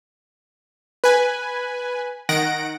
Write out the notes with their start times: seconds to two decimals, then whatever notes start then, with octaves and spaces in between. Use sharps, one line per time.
1.04 B4 G#5
2.29 D#3 F#5 A#6 D7